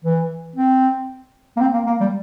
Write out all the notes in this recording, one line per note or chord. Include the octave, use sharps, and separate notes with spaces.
E3
C4
A#3
C4
A#3
A#3
G3